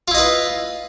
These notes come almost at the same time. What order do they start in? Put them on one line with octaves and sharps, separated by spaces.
F4 E4 D#5 B4